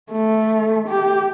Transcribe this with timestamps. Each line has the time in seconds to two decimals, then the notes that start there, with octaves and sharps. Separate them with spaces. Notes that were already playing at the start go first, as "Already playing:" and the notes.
0.11 A3
0.88 G4